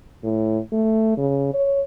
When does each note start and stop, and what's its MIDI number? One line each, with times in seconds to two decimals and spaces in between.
0.24 0.58 45
0.72 1.15 57
1.17 1.52 49
1.54 1.81 73